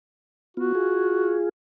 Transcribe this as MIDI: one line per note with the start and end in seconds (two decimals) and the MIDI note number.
0.57 0.72 59
0.57 0.72 65
0.57 1.37 66
0.75 1.49 65
0.75 1.49 68